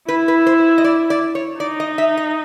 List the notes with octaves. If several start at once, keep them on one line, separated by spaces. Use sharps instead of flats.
E4 B4
B4
C5
D#5
D5
D5
C#5
D#4 D5
D#5
E5
D#5